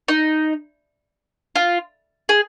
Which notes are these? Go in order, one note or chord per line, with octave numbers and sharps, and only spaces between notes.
D#4
F4
G#4